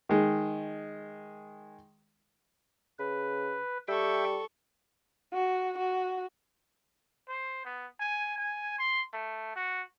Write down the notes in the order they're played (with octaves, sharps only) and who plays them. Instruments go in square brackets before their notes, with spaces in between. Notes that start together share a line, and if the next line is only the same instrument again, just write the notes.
[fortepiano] D#3 G#3
[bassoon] C#3 [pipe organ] B4
[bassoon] G3 [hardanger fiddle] A4 C#6 [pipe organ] E5 G5
[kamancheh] F#4
F#4
[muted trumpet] C5
B3
G#5
G#5
C6
A3
F#4